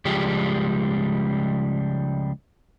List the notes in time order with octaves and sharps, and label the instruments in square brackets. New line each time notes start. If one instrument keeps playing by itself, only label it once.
[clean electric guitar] C#2 F3 G3 G#3 G4